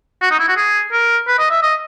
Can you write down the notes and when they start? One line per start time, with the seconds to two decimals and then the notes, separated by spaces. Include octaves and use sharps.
0.22 F#4
0.31 D#4
0.39 E4
0.48 F#4
0.56 G#4
0.92 A#4
1.27 B4
1.39 D#5
1.51 E5
1.63 D#5